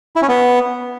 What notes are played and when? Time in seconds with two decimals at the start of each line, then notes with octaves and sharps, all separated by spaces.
0.16 E4
0.22 C#4
0.28 B3